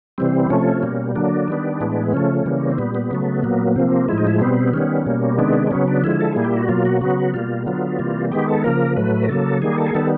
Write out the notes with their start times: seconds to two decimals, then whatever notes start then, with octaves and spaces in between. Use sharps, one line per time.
0.18 C3 E3 G3 C4
0.50 C3 F3 A3 C#4
0.83 B2 G3 A#3
1.15 D3 F#3 A#3 D4
1.48 D#3 G3 B3
1.80 A2 E3 G#3 B3
2.13 C#3 F3 A3 C#4
2.46 C#3 E3 G3 A#3
2.70 C4
2.78 A#2 G3 B3
2.95 B3
3.11 C#3 F#3 A3
3.43 A#2 F#3 A#3
3.67 B3
3.76 C3 F3 A#3 C4
4.09 A2 F3 G#3 E4
4.18 D#4
4.27 E4
4.41 B2 G3 B3 C4
4.73 D#3 G3 B3 C#4
5.06 B2 G3 A#3
5.39 C3 D#3 G#3 B3 D4
5.67 D4
5.71 C#3 F#3 B3 C#4
5.88 D4
6.04 D3 F3 G#3 E4
6.21 A4
6.33 A#2 G3 A#3 G#4
6.45 G4
6.57 F#4
6.69 B2 F#3 A#3 F4
6.85 F#4
7.01 C#3 F#3 B3 F#4
7.34 B2 G3 A#3 F4
7.66 D3 F#3 B3 F4
7.99 C3 E3 G3 A#3
8.32 D#3 G#3 B3 G4
8.48 A4
8.64 C#3 F3 A#3 A#4
8.97 A2 F#3 A3 B4
9.23 A#4
9.29 C#3 F#3 A#3 A4
9.62 D#3 G3 A#3 G#4
9.78 A4
9.86 G#4
9.95 D#3 G3 B3 A4